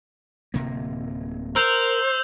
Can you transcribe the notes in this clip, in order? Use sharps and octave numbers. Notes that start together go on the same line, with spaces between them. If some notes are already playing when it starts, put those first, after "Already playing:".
D1 C3 A#3
A#4 C5 E6 G6 F7